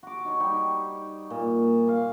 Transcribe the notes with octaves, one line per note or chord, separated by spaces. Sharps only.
F#4 D6
D#4 C#5
G3 D#4 G5
A#2
A#3 F5